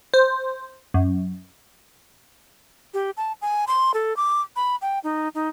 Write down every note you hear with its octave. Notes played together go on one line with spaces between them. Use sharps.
C5
F#2
G4
A5
G#5
C6
A4
D6
B5
G5
D#4
D#4